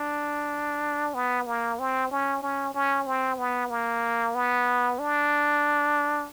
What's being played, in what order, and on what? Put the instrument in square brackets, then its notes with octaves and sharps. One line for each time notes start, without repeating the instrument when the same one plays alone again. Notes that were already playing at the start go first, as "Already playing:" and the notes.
Already playing: [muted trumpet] D4
B3
A#3
C4
C#4
C#4
C#4
C4
B3
A#3
B3
D4